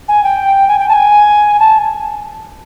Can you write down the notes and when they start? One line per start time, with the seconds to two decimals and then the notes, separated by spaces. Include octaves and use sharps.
0.08 G#5
0.23 G5
0.68 G#5
0.79 G5
0.88 A5
0.92 G#5
1.59 A5